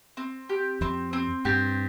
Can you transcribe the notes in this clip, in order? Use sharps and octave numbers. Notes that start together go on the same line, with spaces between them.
C4
G4
F2 C4
C4
G2 G4